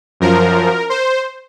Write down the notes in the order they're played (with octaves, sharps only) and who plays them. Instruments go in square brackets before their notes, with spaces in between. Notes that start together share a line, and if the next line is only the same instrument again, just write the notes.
[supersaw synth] F#2 F3 A#4
C5